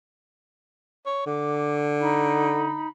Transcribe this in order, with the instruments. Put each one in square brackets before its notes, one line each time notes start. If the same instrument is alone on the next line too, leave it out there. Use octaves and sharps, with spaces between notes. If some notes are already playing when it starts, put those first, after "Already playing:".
[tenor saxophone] C#5
[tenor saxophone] D3 [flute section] D6
[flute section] D#4 B5